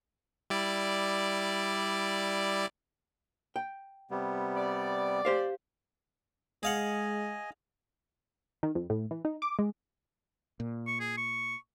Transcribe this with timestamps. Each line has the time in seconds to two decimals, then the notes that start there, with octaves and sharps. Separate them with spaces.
0.50 G3 E4 D5
3.56 G5
4.11 C3 G3 B3
4.57 D5
5.25 G4 C5 F5
6.63 G#3 G#4 D#5 F5 F#5 G#5
8.63 D#3
8.75 F2
8.90 A2
9.11 E3
9.25 D#4
9.42 D6
9.59 G#3
10.60 A#2
10.87 C#6
11.00 G#4
11.18 C#6